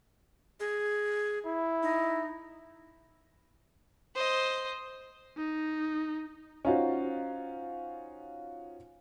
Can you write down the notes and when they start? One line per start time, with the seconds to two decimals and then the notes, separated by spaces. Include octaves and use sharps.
0.60 G#4
1.45 E4
1.83 D#4
4.15 C5 D#5
5.37 D#4
6.65 C#4 D#4 F4 F#4 C5